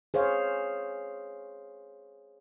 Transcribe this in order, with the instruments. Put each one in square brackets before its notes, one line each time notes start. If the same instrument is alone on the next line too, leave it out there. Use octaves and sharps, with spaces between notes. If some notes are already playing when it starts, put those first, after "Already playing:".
[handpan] G#4 C5 C#5 F5